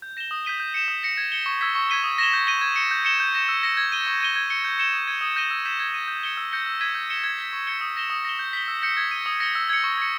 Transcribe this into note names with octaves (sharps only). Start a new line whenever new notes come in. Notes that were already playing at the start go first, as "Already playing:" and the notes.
G6
A#6 E7 G7
D#6
G6 B6 D#7 G7
G6
C#7 E7
D#6
A#6 C#7
G#6
C#7 G7
C#6
E6 G#6 B6
C#6
G#6 B6 D#7 G7
D#6
A#6 E7 G7
G6
A#6 D#7 G7
G#6
C#7 G7
G6
C#7 E7 G7
G6
A#6 E7
E6
A#6 C#7 E7
G#6
D#7 G7
C#6
G#6 D#7 G7
G#6
C#7 G7
G6
C#7 E7 G7
D#6
G#6 D#7
D#6
G6 A#6 D#7 G7
E6
G6 B6 E7
G#6
D#7 G7
G6
C#7 E7 G7
E6
G6 A#6 C#7 G7
E6
G#6 B6 D#7 G7
G6
C#7 E7 G7
G#6
B6 G7
C#6
G#6 C#7 G7
D#6
A#6 E7 G7
D#6
A#6 E7 G7
G6
B6 G7
E6
G6 A#6 C#7
G#6
D#7 G7
D#6
A#6 C#7 G7
E6
G#6 C#7
C#6
G#6 C#7